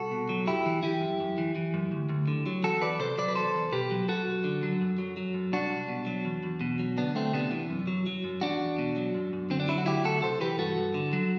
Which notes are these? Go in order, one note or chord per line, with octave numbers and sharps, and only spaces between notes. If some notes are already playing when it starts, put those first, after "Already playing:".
Already playing: C2 F#4 A4
B2
F#3
F#2 E4 G4
E3
E3 E4 G4
F#2
F#2
E3
E3
F#2
D2
D2
D3
F#3
E2 F#4 A4
E2 B4 D5
C3 A4 C5
F#3 B4 D5
B4
E2 A4 C5
E2
B2 G4 B4
F#3
F#2 F#4 A4
F#2
D3
F#3
F#2
F#3
F#3
F#2
C2 D4 F#4
C2
B2
F#3
E2
E2
B2
F#3
D2 B3 D4
D2 A3 C4
C3 B3 D4
E3
F#2
F#3
F#3
F#2
E2 D4 F#4
E2
B2
F#3
F#2
F#2
D3 C4
D4
F#3 E4
F#4
D2 E4 G4
D2 F#4 A4
C3 A4 C5
E3 G4 B4
G2 F#4 A4
G2
D3
F#3